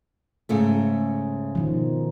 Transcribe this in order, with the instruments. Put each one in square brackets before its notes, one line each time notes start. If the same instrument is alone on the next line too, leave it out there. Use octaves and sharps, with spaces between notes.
[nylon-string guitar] G#2 C#3 A3
[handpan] B2 D#3 F3